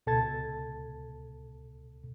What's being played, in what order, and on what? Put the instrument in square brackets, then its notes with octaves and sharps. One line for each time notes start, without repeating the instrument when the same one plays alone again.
[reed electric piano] C#2 B2 A4 A5 G#6 A6